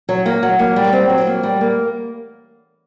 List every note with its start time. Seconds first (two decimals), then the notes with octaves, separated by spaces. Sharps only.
0.09 F#3
0.26 A#3
0.43 F#3
0.59 A#3
0.76 G3
0.93 C4
1.10 F#3
1.27 A#3
1.43 G3
1.61 A#3